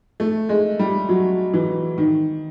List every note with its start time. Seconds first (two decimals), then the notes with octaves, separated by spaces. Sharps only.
0.20 A3
0.49 G#3
0.79 G3
1.09 F#3
1.54 E3
1.98 D#3